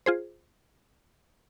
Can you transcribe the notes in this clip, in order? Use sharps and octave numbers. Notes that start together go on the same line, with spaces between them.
F4 G#4 C5